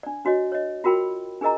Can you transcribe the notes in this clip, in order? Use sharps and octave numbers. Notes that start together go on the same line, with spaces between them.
D4 D5
D4 F#4 C#5 D#5
C#5 D#5
F4 F#4 A#4 G5 B5
D4 G#4 A#4 D#5 A#5